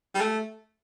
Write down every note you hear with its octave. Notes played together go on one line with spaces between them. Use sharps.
G3
A3